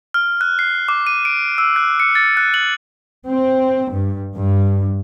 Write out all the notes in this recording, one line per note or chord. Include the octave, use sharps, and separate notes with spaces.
F6
F#6
C7
D6
D#7
D7
E6
F#6
C#7
A6
F#6
F#7
C4
G2
G2